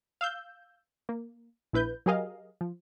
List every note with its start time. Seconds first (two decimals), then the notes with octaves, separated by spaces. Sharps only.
0.21 F5 E6 G6
1.09 A#3
1.73 A#1 E4 B4 G6
2.06 F#3 G4 G#4 A#4 D#5 F5
2.61 F3